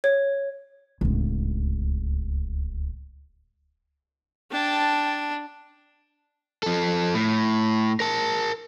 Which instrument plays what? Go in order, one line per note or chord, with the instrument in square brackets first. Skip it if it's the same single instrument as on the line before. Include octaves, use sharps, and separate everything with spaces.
[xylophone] C#5
[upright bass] D1 C#2
[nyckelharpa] D4 [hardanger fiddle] G5 A5
[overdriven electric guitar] F3 A4
A2
A#4 A5